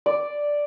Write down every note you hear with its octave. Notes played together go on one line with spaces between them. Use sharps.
D5